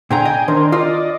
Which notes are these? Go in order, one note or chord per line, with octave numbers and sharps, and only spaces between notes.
A#2 D3 G5 G#5 A#5
D#5
D#3 D4 A#4 C5
F4 D5 D#5